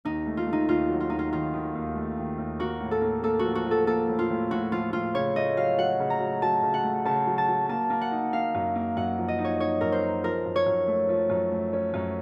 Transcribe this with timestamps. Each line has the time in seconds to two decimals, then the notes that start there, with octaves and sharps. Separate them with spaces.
0.05 D#2 D#4
0.26 A3
0.37 F4
0.47 A3
0.53 D#4
0.68 D#2 F4
0.90 F#3
1.00 F4
1.10 D#2 D#4
1.19 F4
1.32 D#3 F4
1.54 D#3
1.75 D#2
1.95 A3
2.18 D#3
2.38 D#2
2.59 A#3 F#4
2.80 A2
2.91 A4
3.02 A#3
3.23 A#3 A4
3.39 F#4
3.44 F3
3.55 F#4
3.66 F3
3.71 A4
3.87 A#3 A4
4.09 A2
4.19 F4
4.30 A2
4.51 A2 F#4
4.72 F3 F4
4.93 A2 F4
5.14 C#3 C#5
5.36 A3 D#5
5.57 F#3 F5
5.78 F#3 F#5
6.00 C#3
6.10 A#5
6.20 F#3
6.42 F#3 A5
6.63 C#3
6.74 F#5
6.84 A3
7.05 C#3 A5
7.27 F#3
7.38 A5
7.48 F#3
7.69 A#3 A5
7.90 A#3
8.01 F#5
8.11 D#4
8.33 A#3 F5
8.55 F#2
8.76 A#3
8.97 F#2 F#5
9.18 F3
9.28 D#5
9.39 D#4
9.44 C#5
9.60 D#4 C#5
9.81 F#2 A#4
9.92 C5
10.03 D#4
10.24 F3 A#4
10.45 F#2
10.56 C#5
10.66 F#2
10.87 A3
11.09 F3
11.30 F#2
11.52 A3
11.73 C#4
11.94 F#2